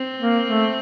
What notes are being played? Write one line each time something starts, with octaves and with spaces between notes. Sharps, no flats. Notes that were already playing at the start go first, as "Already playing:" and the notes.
Already playing: C4
A#3
A3